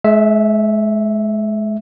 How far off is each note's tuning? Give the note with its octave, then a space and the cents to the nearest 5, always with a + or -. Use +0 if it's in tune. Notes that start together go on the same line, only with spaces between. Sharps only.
G#3 +35 E5 -5